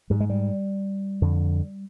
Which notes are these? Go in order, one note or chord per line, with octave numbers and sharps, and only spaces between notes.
G#2 G3
G#3
G3
F2 D3